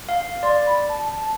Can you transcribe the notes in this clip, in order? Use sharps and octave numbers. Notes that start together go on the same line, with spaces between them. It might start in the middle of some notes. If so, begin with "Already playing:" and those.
F5
D5 C6
B5
A5
A5